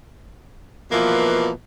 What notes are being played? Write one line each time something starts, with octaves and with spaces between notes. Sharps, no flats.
B2 E3 F3 A#3